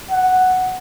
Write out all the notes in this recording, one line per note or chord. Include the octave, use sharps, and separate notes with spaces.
F#5